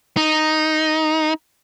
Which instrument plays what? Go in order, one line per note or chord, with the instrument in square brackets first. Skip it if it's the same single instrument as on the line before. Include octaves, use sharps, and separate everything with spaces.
[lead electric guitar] D#4